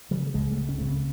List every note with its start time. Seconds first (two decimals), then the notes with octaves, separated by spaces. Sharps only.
0.11 C#3 F#3
0.34 C#2 G#3
0.51 A3
0.57 C#3
0.69 C#4
0.78 C#3 A3
0.87 C4